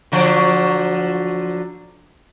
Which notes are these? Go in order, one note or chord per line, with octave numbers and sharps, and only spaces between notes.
D3 F3 F#3